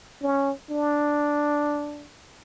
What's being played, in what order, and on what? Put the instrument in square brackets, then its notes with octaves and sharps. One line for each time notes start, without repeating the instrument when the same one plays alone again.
[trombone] C#4
D4